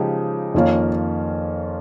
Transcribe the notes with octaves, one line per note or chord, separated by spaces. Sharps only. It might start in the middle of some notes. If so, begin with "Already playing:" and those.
Already playing: C#3 F3 G#3 D#4 G4
F2 D#3 A#3 C#4 F4